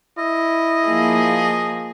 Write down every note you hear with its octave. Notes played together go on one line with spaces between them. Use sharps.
E4 D#5
F3 A#3 G#4